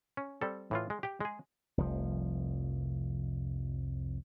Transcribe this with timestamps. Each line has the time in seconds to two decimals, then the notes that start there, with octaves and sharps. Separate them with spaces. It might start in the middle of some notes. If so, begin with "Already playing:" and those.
0.17 C#4
0.41 G3 C4 A4
0.71 A2 E3 F4
0.90 G#3
1.03 G4 G5
1.20 G#3 G#4
1.78 F1 C2 F3